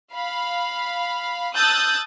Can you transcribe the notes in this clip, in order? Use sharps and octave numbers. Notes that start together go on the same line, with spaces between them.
F5 B5
A5 D#6 E6 F#6 G6 A6